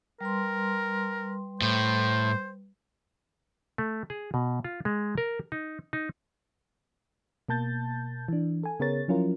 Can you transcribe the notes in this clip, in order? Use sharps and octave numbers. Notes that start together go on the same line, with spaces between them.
G3 A#4 B4 C6
A2 C5
A3
G#4
B2
F4
G#3
A#4
D#4
D#4
B2 A#3 A5 G6 A6
E3 D4
A4 G#5
C#3 B3 G#4 A#4 C#5 A6
F3 F#3 C#4 E4 F4 A#4